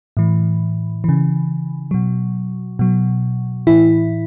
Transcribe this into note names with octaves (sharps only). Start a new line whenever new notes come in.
A2 E3
C#3 E3
B2 F#3
B2 F#3
A2 E3 E4